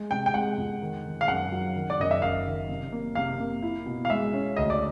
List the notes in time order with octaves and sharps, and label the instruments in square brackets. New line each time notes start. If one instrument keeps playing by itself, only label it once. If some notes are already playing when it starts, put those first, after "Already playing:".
Already playing: [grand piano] G#3
[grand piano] C3 [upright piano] G5
[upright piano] G5
[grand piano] G#3 [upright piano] F#5
[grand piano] F2
D#3
D#3
[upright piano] F5
[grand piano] F#2 [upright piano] F#5
[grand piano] F#3
D#3
[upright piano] D5
[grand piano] F#2 [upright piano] D#5
[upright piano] E5
[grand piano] F#1 [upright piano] F5
[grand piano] D#3
C3
A#3
[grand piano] C3 [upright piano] F5
[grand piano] A#3
E4
B2
[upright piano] F5
[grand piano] G#3 [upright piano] E5
[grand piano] C#4
[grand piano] D2 [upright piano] D#5
[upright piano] D5